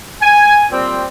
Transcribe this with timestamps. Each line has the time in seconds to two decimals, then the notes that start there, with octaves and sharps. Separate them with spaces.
0.22 G#5
0.70 A#2 G3 C4